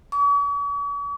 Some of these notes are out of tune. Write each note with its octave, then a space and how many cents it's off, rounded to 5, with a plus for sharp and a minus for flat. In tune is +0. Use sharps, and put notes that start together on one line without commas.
C#6 +45